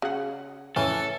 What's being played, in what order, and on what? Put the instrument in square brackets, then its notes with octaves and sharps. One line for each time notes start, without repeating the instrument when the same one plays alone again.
[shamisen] C#3 [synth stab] F#4 G#4 F#5
[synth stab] F2 A2 C#3 [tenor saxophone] E3 [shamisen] C#4 [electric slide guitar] A4